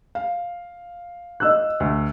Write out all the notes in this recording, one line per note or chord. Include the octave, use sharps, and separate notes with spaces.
F5
D#5 E6 F#6
D2